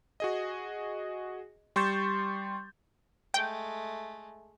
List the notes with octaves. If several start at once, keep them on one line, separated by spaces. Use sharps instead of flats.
F#4 G#4 D#5
G3 C6 C#6 G6 A6 E7
G#3 A3 G5